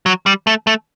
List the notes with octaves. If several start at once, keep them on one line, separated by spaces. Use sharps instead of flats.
F#3
G3
A3
A3